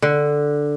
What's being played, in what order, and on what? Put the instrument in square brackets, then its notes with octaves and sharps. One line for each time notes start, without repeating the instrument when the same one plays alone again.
[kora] D3